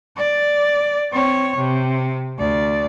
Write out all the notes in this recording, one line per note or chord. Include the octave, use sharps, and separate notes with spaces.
D5
C4 C#5
C3
D2 D5